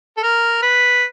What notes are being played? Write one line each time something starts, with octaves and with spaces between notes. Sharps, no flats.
A4
A#4
B4